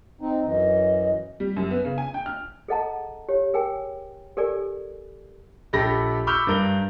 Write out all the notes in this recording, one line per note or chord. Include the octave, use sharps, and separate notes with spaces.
C4 D#4
F#2 E3 D#5
G3
F#2
B3
C#3
G#5
G5
F6
G#4 A4 D#5 F#5 A5 A#5
G4 C#5
G#4 A#4 G5 G#5
G4 A4 A#4 D5 G#5
A#1 G4 A4 B5 A#6
B5 C#6 D6 E6 F6 G6
G2 A#4 G7